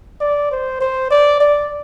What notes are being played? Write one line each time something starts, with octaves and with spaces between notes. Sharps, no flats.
D5
C5
C5
D5
D5